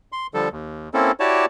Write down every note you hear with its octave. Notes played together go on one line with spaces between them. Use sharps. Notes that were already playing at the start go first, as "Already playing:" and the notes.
C6
D3 F3 G3 A4
D#2
A#3 C4 C#4 E4 A4
E4 F#4 G4 C#5 D5 A5